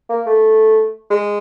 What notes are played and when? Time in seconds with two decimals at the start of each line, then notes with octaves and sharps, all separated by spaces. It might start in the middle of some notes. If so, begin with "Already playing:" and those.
0.09 A#3
0.26 A3
1.11 G#3